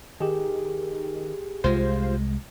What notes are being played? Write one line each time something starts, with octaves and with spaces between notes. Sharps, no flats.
D#3 G4 G#4
C2 G#3 F4 C5